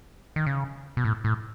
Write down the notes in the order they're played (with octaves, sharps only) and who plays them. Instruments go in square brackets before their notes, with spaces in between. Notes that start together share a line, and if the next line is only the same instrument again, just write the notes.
[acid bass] D#3
C#3
B2
A2
A2